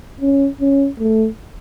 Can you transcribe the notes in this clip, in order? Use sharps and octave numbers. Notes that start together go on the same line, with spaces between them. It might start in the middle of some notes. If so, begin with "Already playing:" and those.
C#4
C#4
A3